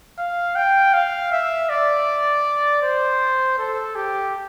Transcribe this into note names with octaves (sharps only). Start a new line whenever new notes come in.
F5
G5
F5
E5
D5
C5
A4
G4